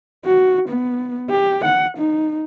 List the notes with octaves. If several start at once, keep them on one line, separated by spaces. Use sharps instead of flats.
F#4
B3
G4
F#5
D#4